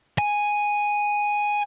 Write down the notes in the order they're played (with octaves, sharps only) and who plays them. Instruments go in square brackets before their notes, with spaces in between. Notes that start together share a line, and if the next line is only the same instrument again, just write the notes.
[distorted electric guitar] G#5